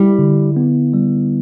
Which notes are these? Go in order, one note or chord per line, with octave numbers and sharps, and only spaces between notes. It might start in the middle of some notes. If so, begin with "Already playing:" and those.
Already playing: G3 E4
D3
B3
G3